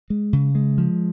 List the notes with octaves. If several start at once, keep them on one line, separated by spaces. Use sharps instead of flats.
G#3
C#3
G#3
F3